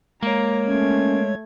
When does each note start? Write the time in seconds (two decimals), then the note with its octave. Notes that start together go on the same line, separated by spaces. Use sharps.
0.23 G#3 A#3 C#5 A#5
0.66 A3 C#4 G#6